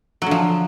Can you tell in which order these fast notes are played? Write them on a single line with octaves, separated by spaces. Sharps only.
F#3 D3 F3